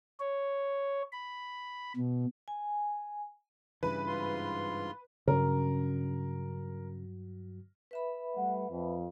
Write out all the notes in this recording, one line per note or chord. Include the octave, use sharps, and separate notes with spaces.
C#5
B5
B2
G#5
G2 C#3 E3 B4
G#2 F4 C6
G2 C#3 F#3 C#4 F#4 A#4
B4 E5 B5
G3 A3 F#5
F2